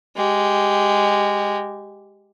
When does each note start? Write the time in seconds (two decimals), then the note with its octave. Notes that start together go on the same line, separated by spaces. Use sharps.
0.16 G#3 G4